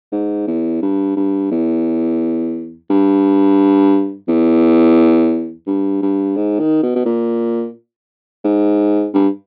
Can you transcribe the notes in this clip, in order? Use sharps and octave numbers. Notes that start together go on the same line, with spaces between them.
G#2
E2
G2
G2
E2
G2
E2
G2
G2
G#2
D#3
B2
B2
A#2
G#2
G2